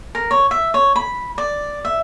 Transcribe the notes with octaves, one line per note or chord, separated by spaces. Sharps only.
A#4
C#5
E5
C#5
B5
D5
E5